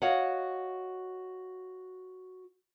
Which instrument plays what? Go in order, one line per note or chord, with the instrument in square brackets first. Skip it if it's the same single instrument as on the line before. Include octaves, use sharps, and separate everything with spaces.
[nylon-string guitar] F#4 C#5 D#5 F5 F#5